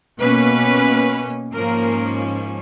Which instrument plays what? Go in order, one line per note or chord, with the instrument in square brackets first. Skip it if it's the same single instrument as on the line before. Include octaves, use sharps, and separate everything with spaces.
[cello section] B2 A#3 C#4 B4
G#2 F3 A#3 C#4 A#4